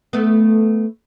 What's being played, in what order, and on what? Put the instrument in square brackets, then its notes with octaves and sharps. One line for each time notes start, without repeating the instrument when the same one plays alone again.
[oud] A3 B3